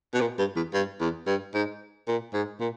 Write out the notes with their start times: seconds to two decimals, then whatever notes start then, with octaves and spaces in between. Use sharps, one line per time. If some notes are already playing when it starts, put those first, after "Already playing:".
0.14 B2
0.21 A#2
0.39 G2
0.56 E2
0.74 G2
1.00 E2
1.27 G2
1.54 G#2
2.08 A#2
2.33 G#2
2.60 A#2